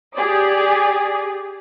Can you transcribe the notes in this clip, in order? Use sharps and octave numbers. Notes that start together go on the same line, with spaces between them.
G4 G#4 D5 D#6